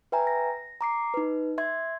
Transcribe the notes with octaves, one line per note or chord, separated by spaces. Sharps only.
B4 E5 G5 G#5 A#5
A#6
A#5 D6 C7
D#4 B4
E5 C6 G#6